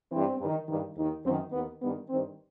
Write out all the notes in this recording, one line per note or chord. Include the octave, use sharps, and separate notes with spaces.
G2 E3 C4
G2
D#3
G2 D#3
D#2 D#3 D#4
F#2 D#3 C4
D#2 D#3 B3
G2 D#3 B3
G2 D#3 C4